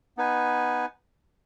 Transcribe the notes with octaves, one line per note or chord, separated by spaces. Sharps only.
B3 D#4 B4 G#5